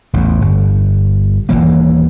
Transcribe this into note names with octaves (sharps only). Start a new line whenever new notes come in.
A1 E2
G1
D#1 E2 E3 A#3